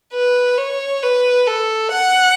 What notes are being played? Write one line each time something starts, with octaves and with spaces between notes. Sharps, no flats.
B4
C#5
B4
A4
F#5